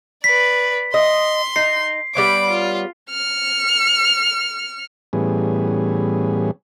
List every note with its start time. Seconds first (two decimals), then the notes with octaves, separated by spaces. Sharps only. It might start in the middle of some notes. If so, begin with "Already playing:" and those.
0.24 B4 D5 B6
0.94 D#5 C6
1.56 D#4 C7
2.15 G3 B3 C#5 B5 D6
2.50 F4
3.10 F6 C#7
5.13 A2 E3 G3 B3 C#4 G#4